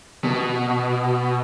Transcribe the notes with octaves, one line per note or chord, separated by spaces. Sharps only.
B2